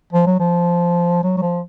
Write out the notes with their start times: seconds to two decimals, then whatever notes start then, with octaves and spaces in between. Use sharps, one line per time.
0.13 F3
0.26 F#3
0.40 F3
1.23 F#3
1.38 F#3
1.42 F3